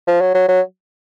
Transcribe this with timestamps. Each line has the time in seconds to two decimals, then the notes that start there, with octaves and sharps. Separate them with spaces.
0.08 F3
0.21 F#3
0.35 F#3
0.48 F#3